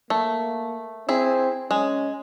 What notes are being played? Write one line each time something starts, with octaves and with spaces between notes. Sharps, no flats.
A3 A#3
C4 E4 G#4
G#3 C#4